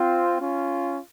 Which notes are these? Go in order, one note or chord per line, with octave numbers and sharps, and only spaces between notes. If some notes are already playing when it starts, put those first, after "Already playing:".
Already playing: C4 F4
C#4 F4